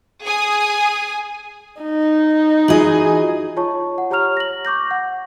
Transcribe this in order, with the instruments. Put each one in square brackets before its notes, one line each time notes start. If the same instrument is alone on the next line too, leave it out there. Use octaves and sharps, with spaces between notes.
[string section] G#4 G#5 D#6
[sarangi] D#4
[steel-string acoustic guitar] E3 D#5 [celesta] F4 F#4 F#7 [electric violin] G#4
[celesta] F4 C#5 A5 C#6
F#5
G4 C#5 A#5 C#6 F6 F7
A#6 F#7
C#6 D6 G6 A#6
F#5